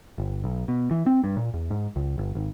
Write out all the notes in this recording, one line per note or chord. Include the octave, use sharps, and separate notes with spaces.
G1
B1
B2
E3
C4
G2
A#2
E2
G#2
C#2
G1
G#1